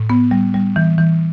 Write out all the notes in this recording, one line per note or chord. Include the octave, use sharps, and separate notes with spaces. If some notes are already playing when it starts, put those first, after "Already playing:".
Already playing: A2
B3
G3
G3
E3
E3